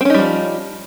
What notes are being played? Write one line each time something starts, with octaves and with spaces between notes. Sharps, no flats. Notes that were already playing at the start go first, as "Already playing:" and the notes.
F3 G3 C4 C#4 D#4